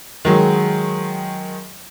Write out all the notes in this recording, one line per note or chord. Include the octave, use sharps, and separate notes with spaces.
D#3 F#3 G#3